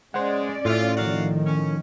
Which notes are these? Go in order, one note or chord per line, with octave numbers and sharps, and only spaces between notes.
G#3 C#4 C5 D5 F#5
A2 F4 E5
D#3 F3 F#4 A#4 F5
C#4